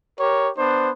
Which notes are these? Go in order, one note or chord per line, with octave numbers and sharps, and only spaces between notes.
G4 A#4 C#5
B3 D4 C5